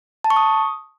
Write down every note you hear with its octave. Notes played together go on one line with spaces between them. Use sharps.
A5
C#6
D#6